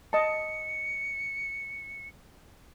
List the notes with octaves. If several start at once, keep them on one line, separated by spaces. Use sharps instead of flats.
D#5 A5 C#7